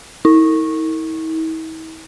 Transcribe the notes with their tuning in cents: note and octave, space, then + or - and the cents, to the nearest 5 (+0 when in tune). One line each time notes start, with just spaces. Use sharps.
E4 -45